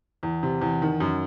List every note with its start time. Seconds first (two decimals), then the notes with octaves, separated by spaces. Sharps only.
0.23 E2
0.43 C3
0.61 E2
0.82 D#3
1.00 F#2